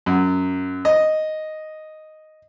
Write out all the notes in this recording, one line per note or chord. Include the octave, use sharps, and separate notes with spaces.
F#2
D#5